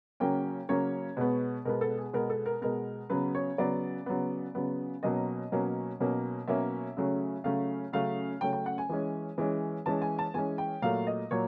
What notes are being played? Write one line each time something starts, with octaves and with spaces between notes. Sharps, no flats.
C#3 F#3 A#3 C#4 G5
C#3 F#3 A#3 C#4 C#5
B2 G#3 B3
B2 G#3 B3 A#4
A4
G#4
B2 G#3 B3 A#4
A4
A#4
B2 G#3 B3 A#4
C#3 F#3 B3 B4
C#5
C#3 F#3 B3 D5
C#3 F#3 B3
C#3 F#3 B3
B2 F#3 A#3 C#4 D#5
B2 F#3 A#3 C#4
B2 F#3 A#3 C#4
B2 F#3 A#3 C#4 E5
C#3 F#3 A3 C#4
C#3 F#3 A3 C#4 F5
C#3 F#3 A3 C#4 F5
C#3 F#3 A3 C#4 G5
G5
F#5
G#5
E3 G#3 C#4
E3 G#3 C#4
E3 G#3 C#4 A5
G#5
A5
E3 G#3 C#4 G#5
G5
A#2 F#3 A3 F5
D#5
A#2 F#3 C#5